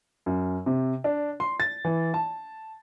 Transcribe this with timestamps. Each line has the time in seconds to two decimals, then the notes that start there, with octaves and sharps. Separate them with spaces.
0.26 F#2
0.66 C3
1.04 D4
1.40 C6
1.60 A6
1.85 E3
2.14 A5